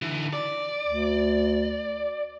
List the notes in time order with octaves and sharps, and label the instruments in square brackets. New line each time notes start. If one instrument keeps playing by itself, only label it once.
[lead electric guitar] D3 E3
D5
[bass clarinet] D2